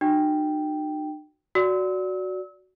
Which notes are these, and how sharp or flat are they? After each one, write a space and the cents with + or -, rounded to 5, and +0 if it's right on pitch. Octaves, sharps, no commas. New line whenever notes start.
D#4 -45 F#4 +0 G5 +0
F#4 +0 D5 -15 E6 -40